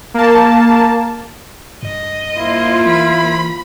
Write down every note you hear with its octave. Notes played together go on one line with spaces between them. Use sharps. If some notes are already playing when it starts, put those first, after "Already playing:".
A#3 A5
G2 D#5
A#3 E4 F4 C5
E3 B5